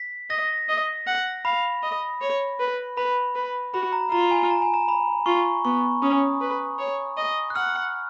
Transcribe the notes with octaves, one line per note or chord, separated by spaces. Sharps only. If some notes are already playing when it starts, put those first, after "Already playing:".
Already playing: B6
D#5 A#6
D#5
F#5
F5 B5
D#5
C#5
B4
B4 B5
B4
F#4 B5
A#5
F4 A#5
G#5
A#5
G#5
A#5
B5
F4 C#6
B3 C#6
C#4 D#6
B4
C#5
D#5
F#6
F#5 F6